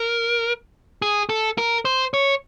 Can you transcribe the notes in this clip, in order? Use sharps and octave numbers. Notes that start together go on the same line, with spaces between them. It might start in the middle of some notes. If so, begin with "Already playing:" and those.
Already playing: A#4
G#4
A4
A#4
C5
C#5